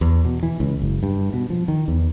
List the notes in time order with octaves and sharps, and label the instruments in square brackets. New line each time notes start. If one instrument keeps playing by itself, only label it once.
[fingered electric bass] E2
B2
E3
C#2
F#1
G2
B2
F3
D#3
E2